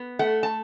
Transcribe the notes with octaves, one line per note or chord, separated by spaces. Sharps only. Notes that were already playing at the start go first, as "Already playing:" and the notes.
Already playing: B3
A3 F#5
A5